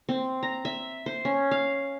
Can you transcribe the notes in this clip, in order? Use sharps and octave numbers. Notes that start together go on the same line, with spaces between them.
C4
A#5
E5
C5
C#4
F5